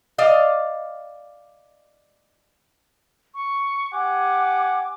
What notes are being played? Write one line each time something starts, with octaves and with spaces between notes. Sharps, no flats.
D5 D#5 F5
C#6
G4 F#5 G#5 D6